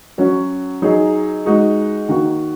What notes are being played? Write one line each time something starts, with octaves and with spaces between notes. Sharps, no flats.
F#3 C#4 F#4
F#3 D#4 G#4
G#3 D#4 F#4
D#3 A#3 F#4